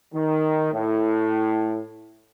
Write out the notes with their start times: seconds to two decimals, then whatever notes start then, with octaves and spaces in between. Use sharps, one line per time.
0.14 D#3
0.73 A2